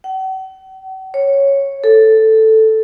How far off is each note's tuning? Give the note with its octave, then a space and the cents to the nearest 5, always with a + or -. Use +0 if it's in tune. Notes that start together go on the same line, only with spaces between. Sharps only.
F#5 +45
C#5 -5
A4 +0